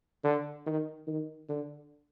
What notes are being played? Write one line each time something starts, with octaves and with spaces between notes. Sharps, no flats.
D3
D#3
D#3
D3